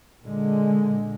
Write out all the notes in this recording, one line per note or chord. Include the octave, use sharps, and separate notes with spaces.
A#2 D3 G#3